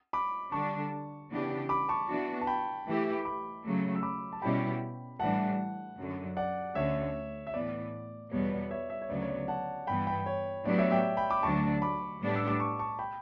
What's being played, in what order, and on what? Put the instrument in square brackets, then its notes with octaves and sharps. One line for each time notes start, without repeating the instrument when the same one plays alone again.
[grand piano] B5 D6
[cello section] D3 G3 D4 [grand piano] A5 C#6
[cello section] C#3 E3 B3 D4 G4
[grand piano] B5 D6
A5 C#6
[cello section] E3 B3 D4 F#4
[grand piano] A5
G5 B5
[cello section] E3 A3 E4 G4
[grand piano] B5 D6
[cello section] C#3 F#3 A3
[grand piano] E6
B5 D6
A5
[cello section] B2 G3 C#4 E4 G4 [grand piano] G5 B5
[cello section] A2 E3 G3 D4 [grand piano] F#5 A5
[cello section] F#2 D3 F#3
[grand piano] D5 F#5
[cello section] D2 D3 A3 C#4 [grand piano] C#5 E5
[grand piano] E5
[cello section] A2 E3 B3 [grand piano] D5
[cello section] E2 B2 G3 B3 [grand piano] C#5
[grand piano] D5
C#5 E5
C#5 E5
C#5
[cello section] D2 C#3 F#3 B3 [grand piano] D5
[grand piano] C#5
D5
F#5 A5
[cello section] G2 E3 B3 [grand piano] G5 B5
[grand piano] G5 B5
C#5
[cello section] A2 F#3 B3 D4 G4 [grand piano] D5
[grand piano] C#5 E5
E5 G5
G5 B5
B5 D6
[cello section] D2 D3 F#3 A3 D4 [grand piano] A5 C#6
[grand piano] B5 D6
[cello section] A2 G3 B3 D4 G4
[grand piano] E6
D6
A5 C#6
A5 C#6
G5 B5